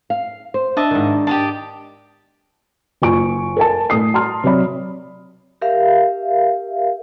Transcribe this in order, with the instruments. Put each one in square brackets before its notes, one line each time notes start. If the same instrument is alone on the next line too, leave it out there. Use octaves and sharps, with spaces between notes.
[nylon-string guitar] F5
C5
[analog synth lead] D4 [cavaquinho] D#5 E5 A5
[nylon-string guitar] G#2 D#3
[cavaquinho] G4 D#5 A5
[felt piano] F#1 F4 G#5 C#6 D7
A4 A#4 G#5 A5
A2 A3 D#6 C7
A5 A#5 C6 F6
C3 F#3 C#5 D5 B5
[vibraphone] G4 A#4 E5 F5